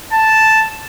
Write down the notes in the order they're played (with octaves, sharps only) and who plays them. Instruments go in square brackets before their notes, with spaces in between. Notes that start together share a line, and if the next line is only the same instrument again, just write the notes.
[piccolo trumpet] A5